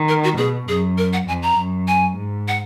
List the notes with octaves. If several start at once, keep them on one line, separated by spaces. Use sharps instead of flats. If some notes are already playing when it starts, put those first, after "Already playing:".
Already playing: D#3
A#4
F#4
B2 G#4
F#2 G#4
A#4
F#5
F2 G#5
A#5
F#2
G#5
G#2
F#5